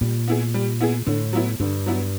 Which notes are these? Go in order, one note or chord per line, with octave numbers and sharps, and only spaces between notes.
A#2 G3
B3 E4 G#4
G3
B3 E4 G#4
A2 D3
F#3 B3 E4
G2 D3
F#3 B3 E4